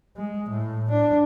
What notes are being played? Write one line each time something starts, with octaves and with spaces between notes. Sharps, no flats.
G#3
A2
D4